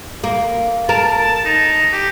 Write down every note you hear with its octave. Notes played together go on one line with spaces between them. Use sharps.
A#3
A#4 A5
D#4
G4